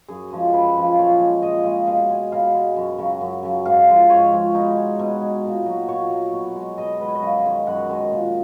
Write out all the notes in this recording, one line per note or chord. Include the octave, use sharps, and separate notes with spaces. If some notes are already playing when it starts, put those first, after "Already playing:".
F#2 G#4
C#3 F3 G#3
F#2 B4
C#3 F3 G#3
A#2 C#5
G#3
A#2 D#5
G#3 F5
B2 F5
G#3
B2 F5
G#3
F#2
C#3 F#3
F#2
C#3 F#3
G#2 F5
F3 G#3
G#2 C#5
F3 G#3
B2 D#4
G#3
B2
G#3
A#2
F#3
A#2 C#5
F#3
B2
G#3
B2 D#5
G#3 B4
C#5
D#5
F#2 F5
D#3 G#3
F#2 F#5
D#3 G#3
A#2